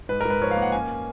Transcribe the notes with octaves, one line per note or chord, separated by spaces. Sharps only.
G#2 B4
G#2 A#4
B4
F3 C#5
F5
A#3
F#5
C#4 G#5